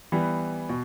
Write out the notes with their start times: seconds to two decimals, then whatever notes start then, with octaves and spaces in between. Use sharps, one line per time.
0.12 E3 G3 B3
0.69 B2